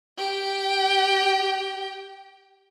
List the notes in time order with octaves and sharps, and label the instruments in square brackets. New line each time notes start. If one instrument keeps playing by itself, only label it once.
[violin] G4 G5